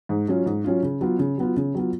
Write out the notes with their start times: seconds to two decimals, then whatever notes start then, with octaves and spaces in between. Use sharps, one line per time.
0.09 G#2
0.28 F#3 C#4 F4
0.46 G#2
0.64 F#3 C#4 F4
0.83 C#3
1.01 F#3 B3 F4
1.19 C#3
1.38 F#3 B3 F4
1.57 C#3
1.74 F#3 B3 F4